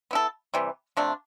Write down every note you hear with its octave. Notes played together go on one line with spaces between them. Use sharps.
B3 E4 A4
C3 E3 G3
C3 F3 A3 D4